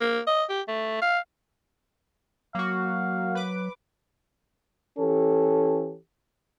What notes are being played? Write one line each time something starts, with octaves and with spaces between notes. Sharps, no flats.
A#3
D#5
G4
A3
F5
F#3 A#3 F#4 F5
B4 D6
E3 C#4 G4 A4